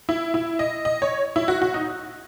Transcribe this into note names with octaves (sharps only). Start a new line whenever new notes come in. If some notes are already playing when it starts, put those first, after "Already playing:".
E4
E4
D#5
D#5
C#5
E4
F#4
F#4
D#4